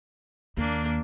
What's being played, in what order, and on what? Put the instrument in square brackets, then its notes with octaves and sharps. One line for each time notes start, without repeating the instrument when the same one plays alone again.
[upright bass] D#2 [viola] A#3 D4